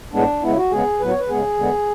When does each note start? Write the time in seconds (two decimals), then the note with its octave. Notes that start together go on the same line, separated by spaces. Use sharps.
0.13 A2 G#3 B3 D4
0.42 C#3 G#3 B3 E4
0.57 F#4
0.71 C#3 G#3 B3 G#4
1.00 A2 F#3 B3 B4
1.10 C#5
1.20 B4
1.29 C#3 G#3 B3 G#4
1.58 D3 G#3 B3